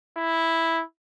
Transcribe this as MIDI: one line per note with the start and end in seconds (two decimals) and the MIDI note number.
0.17 0.83 64